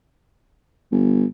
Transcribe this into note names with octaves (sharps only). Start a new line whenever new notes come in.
G1